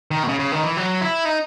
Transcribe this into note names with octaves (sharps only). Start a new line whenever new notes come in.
D#3
B2
C#3
C#3
D#3
E3
F#3
E4
D#4